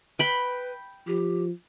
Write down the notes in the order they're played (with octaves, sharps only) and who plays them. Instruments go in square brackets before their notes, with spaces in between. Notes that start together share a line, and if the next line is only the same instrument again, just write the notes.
[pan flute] B4 [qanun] G5 B5
[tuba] F3 [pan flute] G4